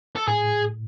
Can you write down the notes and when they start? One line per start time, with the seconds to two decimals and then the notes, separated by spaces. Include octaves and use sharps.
0.16 A4
0.28 A2 G#4